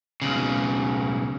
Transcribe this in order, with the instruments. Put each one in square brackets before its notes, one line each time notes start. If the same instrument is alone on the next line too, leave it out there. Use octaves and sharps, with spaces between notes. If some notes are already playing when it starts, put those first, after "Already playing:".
[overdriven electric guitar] B1 C#3